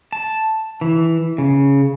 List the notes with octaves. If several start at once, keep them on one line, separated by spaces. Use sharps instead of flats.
A5
E3
C#3